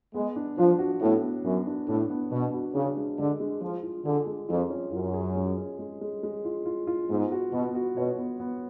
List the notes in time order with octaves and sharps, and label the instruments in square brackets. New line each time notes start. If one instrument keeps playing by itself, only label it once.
[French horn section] G#3 [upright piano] B3
[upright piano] D4
[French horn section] F3 [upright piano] D4
[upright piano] F#4
[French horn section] A2 [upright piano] B3
[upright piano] B3
[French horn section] F#2 [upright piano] B3
[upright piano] D4
[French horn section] A2 [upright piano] D4
[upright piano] B3
[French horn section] B2 [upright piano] D4
[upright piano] F#4
[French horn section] C#3 [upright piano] D4
[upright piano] G#3
[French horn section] D3 [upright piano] G#3
[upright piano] G#3
[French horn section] F3 [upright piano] G#3
[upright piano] F4
[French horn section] D3 [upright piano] G#4
[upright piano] G#3
[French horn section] F2 [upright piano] F4
[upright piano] C#4
[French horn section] F#2 [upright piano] F4
[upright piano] G#4
G#3
C#4
G#3
G#3
G#3
F4
F4
F4
[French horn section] G#2 [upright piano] B3
[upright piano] F#4
[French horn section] B2 [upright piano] B3
[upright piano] F#4
[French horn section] B2 [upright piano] C#5
[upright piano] B3
B3